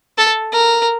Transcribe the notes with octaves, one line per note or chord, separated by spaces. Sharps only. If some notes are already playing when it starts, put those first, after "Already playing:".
A4
A#4